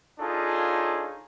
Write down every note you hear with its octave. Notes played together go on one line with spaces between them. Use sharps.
D4 D#4 F4 G#4 A4 C#5